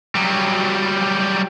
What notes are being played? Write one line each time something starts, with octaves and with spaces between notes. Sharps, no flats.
F#3 G3